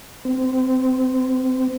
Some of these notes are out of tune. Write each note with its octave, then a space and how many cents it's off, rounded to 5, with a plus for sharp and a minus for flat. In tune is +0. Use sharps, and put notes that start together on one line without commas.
C4 -20